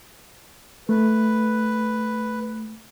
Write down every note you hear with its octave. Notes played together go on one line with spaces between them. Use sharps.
A3 B4